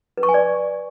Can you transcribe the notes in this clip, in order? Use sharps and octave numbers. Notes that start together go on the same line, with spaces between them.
B4
C#6
G#5
D5